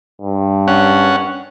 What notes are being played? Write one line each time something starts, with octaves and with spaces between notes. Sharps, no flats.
G2
C#4 F#5